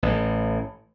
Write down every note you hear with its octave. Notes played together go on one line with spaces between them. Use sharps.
A1 A2